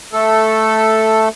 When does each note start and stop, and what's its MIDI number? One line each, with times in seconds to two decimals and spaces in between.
0.13 1.29 57
0.13 1.29 69